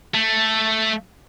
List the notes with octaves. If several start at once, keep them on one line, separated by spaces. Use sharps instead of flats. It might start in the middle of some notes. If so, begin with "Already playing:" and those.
A3